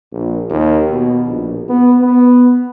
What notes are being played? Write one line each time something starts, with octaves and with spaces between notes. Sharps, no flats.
A#1
D#2
B2
A#1
B3
B3